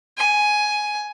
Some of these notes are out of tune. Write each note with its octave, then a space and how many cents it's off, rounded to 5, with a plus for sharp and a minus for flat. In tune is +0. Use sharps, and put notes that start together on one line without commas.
G#5 +10